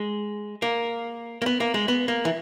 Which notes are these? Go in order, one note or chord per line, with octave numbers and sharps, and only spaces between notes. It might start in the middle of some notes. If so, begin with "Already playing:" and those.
Already playing: G#3
A#3
A#3
B3
A#3
G#3
B3
A#3
E3